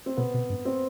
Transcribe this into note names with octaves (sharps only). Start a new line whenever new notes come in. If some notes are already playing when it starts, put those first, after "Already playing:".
C4
B2 B3
B2
G2
C4